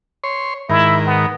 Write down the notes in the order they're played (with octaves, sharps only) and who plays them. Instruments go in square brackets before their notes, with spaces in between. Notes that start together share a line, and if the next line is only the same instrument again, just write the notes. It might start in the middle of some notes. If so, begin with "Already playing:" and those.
[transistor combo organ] C#5 C6
[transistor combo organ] G#2 D#3 A#4 [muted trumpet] E4
[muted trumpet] B3